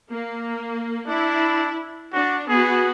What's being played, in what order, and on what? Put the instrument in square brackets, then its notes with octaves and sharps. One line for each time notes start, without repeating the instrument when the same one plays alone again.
[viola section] A#3
[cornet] D4 [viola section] E4
[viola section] D4 [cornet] F#4
[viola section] B3 F#4 [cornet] G#4